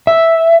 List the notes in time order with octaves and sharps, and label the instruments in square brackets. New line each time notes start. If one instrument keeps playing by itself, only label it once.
[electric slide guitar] E5